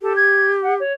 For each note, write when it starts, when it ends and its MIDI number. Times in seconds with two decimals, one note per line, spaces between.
0.02 0.81 67
0.02 0.13 69
0.16 0.51 92
0.62 0.74 78
0.79 0.93 73